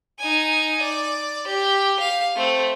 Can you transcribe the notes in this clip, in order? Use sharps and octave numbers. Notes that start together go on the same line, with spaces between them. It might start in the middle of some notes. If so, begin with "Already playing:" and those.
D#4 G#5
D5
G4
F5
A3 C4